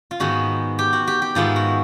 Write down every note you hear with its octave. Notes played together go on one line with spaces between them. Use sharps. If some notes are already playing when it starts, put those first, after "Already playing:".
F4
G#2 D#3 G#3 B3 F#4
G4
F#4
G4
G4
G#2 D#3 G#3 B3 E4 F4
F#4